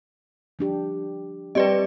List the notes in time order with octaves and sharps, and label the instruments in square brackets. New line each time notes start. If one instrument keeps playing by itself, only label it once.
[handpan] F3 D4 G4
[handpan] G3 C4 G4 [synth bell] B4 D5 D#5